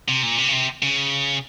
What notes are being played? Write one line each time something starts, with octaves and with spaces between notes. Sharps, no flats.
C3
A#2
C3
C#3
C3
C#3